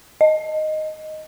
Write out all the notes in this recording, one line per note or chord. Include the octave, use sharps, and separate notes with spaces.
D#5